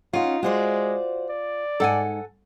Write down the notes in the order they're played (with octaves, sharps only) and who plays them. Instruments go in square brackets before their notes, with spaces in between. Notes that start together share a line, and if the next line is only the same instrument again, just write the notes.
[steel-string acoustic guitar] C#4 F#5 [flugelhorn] D#4 [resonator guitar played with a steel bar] F4
[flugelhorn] G#3 [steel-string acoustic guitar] F#4 C5 D5
[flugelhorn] D5
[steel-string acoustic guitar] G#2 [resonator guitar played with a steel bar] A4 F#5 G#5